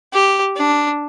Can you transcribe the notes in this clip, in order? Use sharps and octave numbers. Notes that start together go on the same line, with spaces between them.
G4
D4